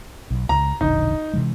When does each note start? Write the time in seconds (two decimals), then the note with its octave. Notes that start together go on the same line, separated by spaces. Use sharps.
0.31 B1
0.49 C#2 A#5
0.81 E1 A#1 D3 D#4
1.33 C3 E3 G#3